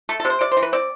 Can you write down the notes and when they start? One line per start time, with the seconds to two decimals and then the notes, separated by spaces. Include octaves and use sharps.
0.09 A3 A4
0.20 A4
0.25 C3
0.30 C5
0.41 C3 D5
0.52 C5
0.57 E3
0.63 B4
0.73 C4 D5